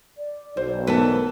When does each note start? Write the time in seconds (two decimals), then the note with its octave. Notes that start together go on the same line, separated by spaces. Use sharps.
0.17 D5
0.57 B1 C5
0.87 E3 A3 B3 A#4 B4 A5